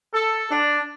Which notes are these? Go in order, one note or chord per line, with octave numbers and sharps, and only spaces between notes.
A4
D4